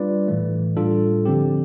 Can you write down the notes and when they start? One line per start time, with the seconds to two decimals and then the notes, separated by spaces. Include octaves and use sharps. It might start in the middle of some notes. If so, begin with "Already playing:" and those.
Already playing: G3 D4 F4 B4 D5
0.28 A2 E3 A3
0.76 A2 G3 D4 F4 A4
1.25 D3 F3 C4 G4